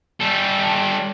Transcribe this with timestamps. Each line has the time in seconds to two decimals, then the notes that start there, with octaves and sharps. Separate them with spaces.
0.20 G3 A4